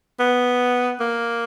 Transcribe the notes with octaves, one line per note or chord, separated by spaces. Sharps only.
B3
A#3